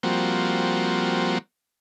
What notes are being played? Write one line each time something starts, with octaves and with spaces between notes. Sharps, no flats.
F3 G3 A#3 C4 F#4